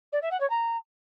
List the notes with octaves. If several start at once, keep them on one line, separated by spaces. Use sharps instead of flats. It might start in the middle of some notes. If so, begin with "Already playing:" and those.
D5
E5
F#5
C#5
A#5